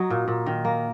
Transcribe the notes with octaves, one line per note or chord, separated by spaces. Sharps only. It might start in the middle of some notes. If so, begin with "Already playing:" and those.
Already playing: F#3 D#4
A#2
A#2
D#3
A#3